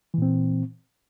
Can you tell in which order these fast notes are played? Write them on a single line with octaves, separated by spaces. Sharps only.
E3 A#2 C4